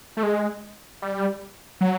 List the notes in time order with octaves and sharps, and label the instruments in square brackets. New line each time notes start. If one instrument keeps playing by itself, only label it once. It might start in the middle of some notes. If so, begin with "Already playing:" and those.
[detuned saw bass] A3
G#3
G3
F#3